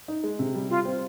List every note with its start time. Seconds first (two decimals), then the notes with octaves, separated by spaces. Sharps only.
0.08 D#4
0.24 G#3
0.39 C3
0.54 G3
0.70 G3 F4
0.85 C4